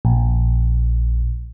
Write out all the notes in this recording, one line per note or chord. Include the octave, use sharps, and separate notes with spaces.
A#1